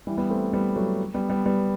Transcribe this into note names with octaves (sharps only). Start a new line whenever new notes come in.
E3 G3
G3 B3
A3 C4
G3 B3
F#3 A3
G3 B3
G3 B3
G3 B3